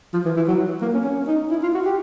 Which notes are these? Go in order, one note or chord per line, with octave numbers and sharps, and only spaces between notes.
F3
E3
E3
F#3
A#3
C#4
C#4
D#4
E4
F4
F#4
G4